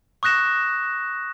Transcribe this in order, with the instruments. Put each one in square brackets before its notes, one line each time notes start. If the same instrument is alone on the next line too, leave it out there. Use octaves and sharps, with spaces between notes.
[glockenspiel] C#6 D#6 F#6 A#6 E7